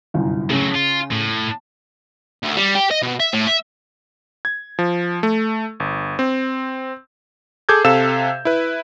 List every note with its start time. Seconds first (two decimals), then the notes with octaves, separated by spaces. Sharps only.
0.14 G1 C2 F#2
0.50 A2 C#3 F#3 C#4
0.75 F4
1.11 A2
2.43 D2
2.56 G3
2.75 G4
2.91 D#5
3.02 B2
3.20 E5
3.33 A2
3.47 E5
4.45 G#6
4.79 F3
5.23 A3
5.80 G1
6.19 C4
7.69 G#4 A4 D6 G6 G#6
7.84 C3 A4 F5 E6 E7
8.45 E4 B4